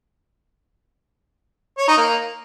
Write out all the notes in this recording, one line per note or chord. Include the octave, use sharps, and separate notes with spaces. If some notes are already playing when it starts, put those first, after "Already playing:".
C#5
D#4
A#3